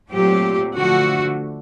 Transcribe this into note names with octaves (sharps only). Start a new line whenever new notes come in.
A#2 F#3 A3 C4 G4
D3 F3 A3 F#4